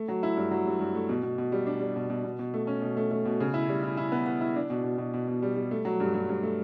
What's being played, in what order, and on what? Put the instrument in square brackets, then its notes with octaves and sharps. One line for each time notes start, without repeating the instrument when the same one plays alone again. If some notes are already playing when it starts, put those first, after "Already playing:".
Already playing: [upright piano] A3
F#3
E4
G2
F#3
G2
G2
A3
B2
B2
B2
G3
D4
G3
B2
B2
B2
B2
A3
C#4
B2
A3
A3
B2
C#3
E4
G3
E4
E4
B3
B3
E4
D4
B2
B2
B2
B2
B2
G3
G3
A3
F#3
G2
G2
G2
A3